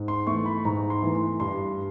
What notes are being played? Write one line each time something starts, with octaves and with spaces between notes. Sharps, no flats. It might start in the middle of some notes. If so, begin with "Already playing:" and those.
Already playing: G#2
C6
E3 A3 C#6
B5
G#2 A#5
C6
E3 A3
C6
G2 C6